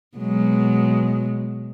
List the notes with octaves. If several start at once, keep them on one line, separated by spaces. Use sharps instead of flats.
B2 F#3 G#3